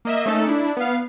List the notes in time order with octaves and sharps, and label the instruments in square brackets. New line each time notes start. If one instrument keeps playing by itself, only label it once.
[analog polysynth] A#3 D#5 E5
A3 C#4 D#4 A4
D4 E4
B3 F5